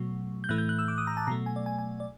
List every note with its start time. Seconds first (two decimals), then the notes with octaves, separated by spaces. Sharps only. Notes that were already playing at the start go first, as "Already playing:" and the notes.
Already playing: B2 F#3 A3
0.44 G6
0.49 A2 E3 A3 F#6
0.58 G6
0.69 F#6
0.79 E6
0.88 D6
0.98 D#6
1.07 A#5
1.17 A5
1.27 B2 F#3 A3 A#5
1.46 G#5
1.56 D5
1.66 G#5
1.79 G#5
2.00 D5